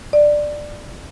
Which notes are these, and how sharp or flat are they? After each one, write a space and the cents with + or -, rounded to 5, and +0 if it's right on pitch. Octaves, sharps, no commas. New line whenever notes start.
D5 +10